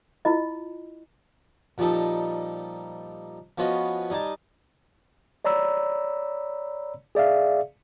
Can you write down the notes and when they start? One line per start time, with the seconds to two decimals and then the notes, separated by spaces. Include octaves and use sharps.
0.25 E4 F4 D#5
1.78 A#2 F3 G3 D#4 A4
3.58 F3 B3 C#4 F4 F#4 D#5
4.10 G3 D#4 G#5 A5
5.45 C#5 D5 A#5 B5 E6
7.15 G#4 D5 E5 F5